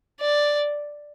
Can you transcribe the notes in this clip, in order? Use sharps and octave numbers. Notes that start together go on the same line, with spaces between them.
D5